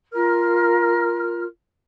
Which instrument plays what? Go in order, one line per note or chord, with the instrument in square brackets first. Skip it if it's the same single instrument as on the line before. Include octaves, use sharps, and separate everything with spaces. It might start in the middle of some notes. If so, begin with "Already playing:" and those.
[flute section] F4 A#4 F6